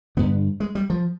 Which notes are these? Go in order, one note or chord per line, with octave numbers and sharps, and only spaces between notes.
G2 D3 B3
G#3
G3
F3